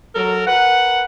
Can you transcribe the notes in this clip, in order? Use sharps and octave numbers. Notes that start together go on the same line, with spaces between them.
F#3 A4 A#4
A#4 B4 F#5